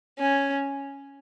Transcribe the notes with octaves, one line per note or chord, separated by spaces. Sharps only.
C#4